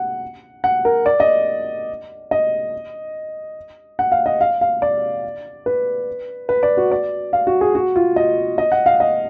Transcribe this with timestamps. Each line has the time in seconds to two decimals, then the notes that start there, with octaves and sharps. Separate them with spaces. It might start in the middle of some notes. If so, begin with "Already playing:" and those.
Already playing: F#5
0.64 F#5
0.85 A#4
1.06 D5
1.20 D#5
2.31 D#5
3.99 F#5
4.12 F5
4.26 D#5
4.41 F5
4.61 F5
4.82 D5
5.66 B4
6.49 B4
6.63 D5
6.77 F#4
6.91 D5
7.33 F5
7.47 F#4
7.61 G#4
7.75 F#4
7.96 F4
8.16 D#5
8.58 D#5
8.72 F#5
8.86 F5
9.00 D#5